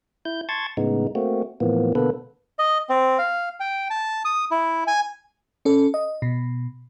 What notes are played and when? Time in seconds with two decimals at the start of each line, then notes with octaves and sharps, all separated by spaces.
0.25 E4 G6
0.49 A5 C6 C#6 G#6 A6
0.77 A2 C#3 G#3 B3 D#4
1.15 A3 A#3 C4 F#4
1.60 A2 E3 F3 A#3 B3
1.95 B2 D3 A#3 B3 A4 B4
2.59 D#5
2.89 C4
3.18 F5
3.60 G5
3.90 A5
4.25 D#6
4.51 E4
4.87 G#5
5.65 C#4 A4
5.94 D#5
6.22 B2